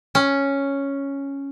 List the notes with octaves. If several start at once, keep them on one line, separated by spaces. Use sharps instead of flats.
C#4